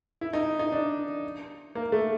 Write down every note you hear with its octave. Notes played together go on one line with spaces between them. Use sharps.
E4
D#4
D#4
D4
A#3
A3